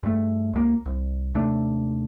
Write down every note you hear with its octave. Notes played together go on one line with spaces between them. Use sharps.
G2 A3
C#2 A#3
C2
D#2 C3 A3 D4